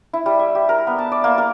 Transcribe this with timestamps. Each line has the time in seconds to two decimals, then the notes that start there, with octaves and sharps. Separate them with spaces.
0.13 E4
0.26 G3
0.39 E5
0.55 G4
0.69 A#4
0.87 B3
0.98 A5
1.12 D5
1.24 A#3
1.38 A#4